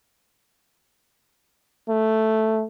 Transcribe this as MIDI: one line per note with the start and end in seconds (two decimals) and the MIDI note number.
1.89 2.65 57